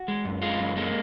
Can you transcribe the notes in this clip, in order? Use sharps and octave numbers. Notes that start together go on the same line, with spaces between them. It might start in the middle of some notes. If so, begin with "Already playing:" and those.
Already playing: F#4
G#3
F#2
G#3 F4
F#2
G#3 A#3